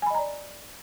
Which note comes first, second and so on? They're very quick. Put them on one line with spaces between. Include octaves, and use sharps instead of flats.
G#5 B5 D#5 A#5 D5